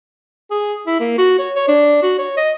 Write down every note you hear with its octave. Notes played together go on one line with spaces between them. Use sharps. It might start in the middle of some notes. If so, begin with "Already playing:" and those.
G#4
E4
A#3
F#4
C#5
C#5
D4
F#4
C#5
D#5